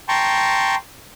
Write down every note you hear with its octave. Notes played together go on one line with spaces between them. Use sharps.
G5 A5 A#5 C6 C#6